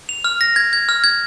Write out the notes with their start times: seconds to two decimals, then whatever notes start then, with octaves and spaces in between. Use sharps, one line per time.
0.09 F7
0.24 F6
0.41 A#6
0.56 G#6
0.73 G#6
0.89 F6
1.04 G#6